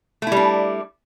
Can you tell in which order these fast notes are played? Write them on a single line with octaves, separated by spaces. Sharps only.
A3 E4 G3 D4